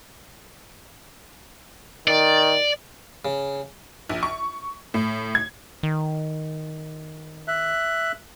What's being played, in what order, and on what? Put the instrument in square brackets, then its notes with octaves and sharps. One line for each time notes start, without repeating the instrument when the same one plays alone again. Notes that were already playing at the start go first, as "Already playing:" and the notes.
[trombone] D#3 [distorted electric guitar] D5
[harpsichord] C#3
[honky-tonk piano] A#1
C#6
A2
G#6
[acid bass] D#3
[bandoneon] E5 F#6